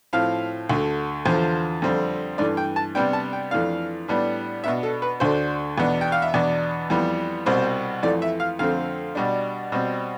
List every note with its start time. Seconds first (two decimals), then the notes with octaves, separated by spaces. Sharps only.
0.13 A2 F3 C4 F5
0.70 D2 D3 A3
1.25 E2 D3 F3 C5
1.82 F2 D3 G3 C4
2.38 G2 E3 A3 D5
2.57 G5
2.76 A5
2.95 C3 G3 B3 D4 G5
3.13 A5
3.33 G5
3.51 F2 E3 A3 D4 F5
4.08 A2 G3 B3 D4
4.64 B2 B3 D4 E5
4.83 A4
5.02 B4
5.20 D2 D3 A3 D4 C5
5.78 E2 B2 B3 D4
6.01 G5
6.12 F5
6.22 E5
6.34 E2 B2 B3 D4 D5
6.90 F2 E3 G3 B3
7.46 C2 B2 G3 C4 C5
8.03 F2 E3 A3 D5
8.22 E5
8.40 F5
8.59 F2 D3 A3 C4 F5
9.15 B2 G3 D4
9.72 B2 G3 C4